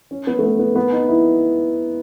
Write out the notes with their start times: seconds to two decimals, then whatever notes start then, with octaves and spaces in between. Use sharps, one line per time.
0.11 C#4
0.27 B3
0.39 A3
0.43 B3
0.59 B3
0.75 B3
0.92 D#4
1.08 E4